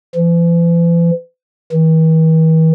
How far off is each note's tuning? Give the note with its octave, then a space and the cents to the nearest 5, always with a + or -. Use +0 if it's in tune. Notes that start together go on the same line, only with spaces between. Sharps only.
E3 +45
E3 -45